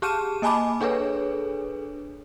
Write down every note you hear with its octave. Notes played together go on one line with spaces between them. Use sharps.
G4 G#4 A5 F6 D#7 E7
A#3 D#5 G#5 A5 B5 D6
D4 G#4 A4 B4 C#5